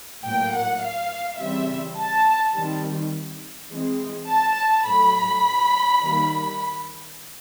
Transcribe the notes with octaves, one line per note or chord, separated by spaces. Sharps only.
A2 F#3 A#3 G5
F#5
F5
C#3 E3 G3 C4 E5
A5
D#3 G3 C4
E3 G#3 C4
A5
A2 F#3 A3 B5
D#3 G3 A#3